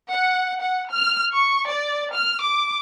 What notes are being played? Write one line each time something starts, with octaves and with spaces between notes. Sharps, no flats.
F#5
F#5
F6
C#6
D5
F6
D6